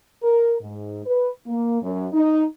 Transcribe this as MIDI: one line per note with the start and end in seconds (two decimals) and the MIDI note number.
0.23 0.56 70
0.61 1.02 44
1.06 1.31 71
1.47 1.83 58
1.83 2.08 42
2.13 2.44 63